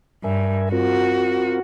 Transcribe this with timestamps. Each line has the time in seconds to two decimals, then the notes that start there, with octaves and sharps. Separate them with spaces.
0.24 G2 A#4 E5 G#5
0.72 C4 F4 F#4 A#4